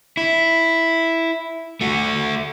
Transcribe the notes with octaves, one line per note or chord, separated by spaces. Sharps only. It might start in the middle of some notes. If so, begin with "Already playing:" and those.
E4
A3 F#4